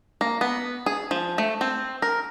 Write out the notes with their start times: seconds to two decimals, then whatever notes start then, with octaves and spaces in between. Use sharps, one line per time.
0.21 A#3
0.41 B3
0.86 G#4
1.11 F3
1.38 A3
1.61 C4
2.02 A#4